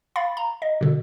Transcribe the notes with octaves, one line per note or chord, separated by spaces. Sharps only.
F5 B5 A6
A#5
D#5
B2 D3